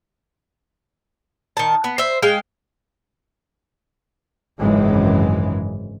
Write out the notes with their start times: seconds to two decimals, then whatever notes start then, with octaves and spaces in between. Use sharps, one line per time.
1.57 D#3 A5
1.84 B3
1.98 C5 E5
2.23 G#3 F5 G5
4.59 G#1 C#2 F#2 E3 G#3